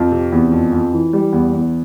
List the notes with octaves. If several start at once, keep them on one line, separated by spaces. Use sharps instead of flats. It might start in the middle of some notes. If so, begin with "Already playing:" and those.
Already playing: F2
C3
E2
F2
F2
E3
G3
E2
E2